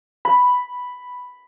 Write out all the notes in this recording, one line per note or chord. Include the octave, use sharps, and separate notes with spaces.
B5